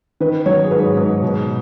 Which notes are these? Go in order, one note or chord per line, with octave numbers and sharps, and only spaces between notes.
D#3 B4
F#3 C#5
G#4
G#2 B4
G#2
B2